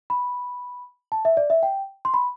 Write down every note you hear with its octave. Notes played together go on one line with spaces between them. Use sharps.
B5
A5
E5
D5
E5
G5
C6
B5